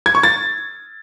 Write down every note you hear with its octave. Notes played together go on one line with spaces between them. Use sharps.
G#6
C#6
A6